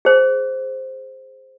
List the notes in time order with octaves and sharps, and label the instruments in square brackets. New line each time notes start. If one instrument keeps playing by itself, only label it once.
[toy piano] G#4 C5